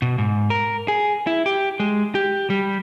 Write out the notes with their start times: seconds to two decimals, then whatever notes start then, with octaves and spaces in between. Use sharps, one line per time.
0.02 B2
0.18 G#2
0.50 A#4
0.88 G#4
1.27 E4
1.46 G4
1.80 G#3
2.15 G4
2.50 G3